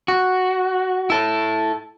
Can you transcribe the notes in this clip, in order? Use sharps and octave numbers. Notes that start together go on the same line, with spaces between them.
F#4
E4 A4